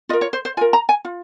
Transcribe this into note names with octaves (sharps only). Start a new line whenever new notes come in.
F4 A#4 D#5
C#5
C5
C5
F4 A#4 G#5
A#5
G#5
F4